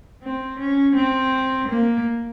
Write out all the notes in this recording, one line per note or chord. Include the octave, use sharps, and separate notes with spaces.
C4
C#4
C4
A#3